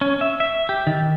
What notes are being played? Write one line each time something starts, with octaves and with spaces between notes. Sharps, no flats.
C#4
E5
E5
G4
D#3